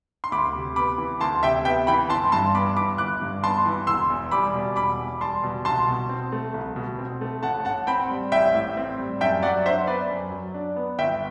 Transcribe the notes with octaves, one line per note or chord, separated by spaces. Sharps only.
C6
D2 B5 D6
C3
B3 B5 D6
E3
D2 A5 C6
C3 E5 G5
B3 E5 G5
E3 G5 B5
G1 A5 C6
G2 A5 C6
B3 B5 D6
E3 B5 D6
G1 D6 F#6
G2
B3 A5 C6
E3
E1 C6 E6
E2
G3 B5 D6
B2
E1 B5 D6
E2
G3 A5 C6
B2
C2 A5 C6
B2
C4
A3
C2
B2
C4
A3
A1 F#5 A5
A2 F#5 A5
C4 G5 B5
G3
A1 E5 G5
A2
C4
G3
F#2 E5 G5
F#3 D5 F#5
D4 C5 E5
B3 B4 D5
F#2
F#3
D4
B3
G1 E5 G5